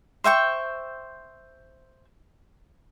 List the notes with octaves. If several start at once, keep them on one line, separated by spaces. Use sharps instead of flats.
C5 E5 G5 C#6